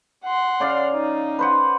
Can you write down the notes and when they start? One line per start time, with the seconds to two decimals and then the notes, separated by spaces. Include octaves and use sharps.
0.25 F#5 C6
0.60 C#3 D5 F5
0.92 D#4
1.39 B4 C5 F#5